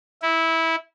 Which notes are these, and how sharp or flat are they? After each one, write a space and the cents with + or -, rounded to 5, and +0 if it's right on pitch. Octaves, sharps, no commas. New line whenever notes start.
E4 -15